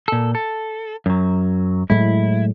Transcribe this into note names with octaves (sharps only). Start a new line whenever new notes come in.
A#2 A4
A4
F#2 F#3
A2 F#3 G#3 E4